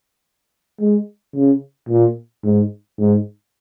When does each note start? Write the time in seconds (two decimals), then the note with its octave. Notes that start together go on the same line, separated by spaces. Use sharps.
0.80 G#3
1.35 C#3
1.89 A#2
2.44 G#2
2.99 G#2